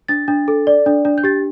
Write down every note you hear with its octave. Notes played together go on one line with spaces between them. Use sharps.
D4 A6
D4
A4
D5
D4
D4
G6
G4 A6